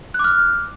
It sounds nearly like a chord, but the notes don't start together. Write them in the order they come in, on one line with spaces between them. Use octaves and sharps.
F#6 D6 F6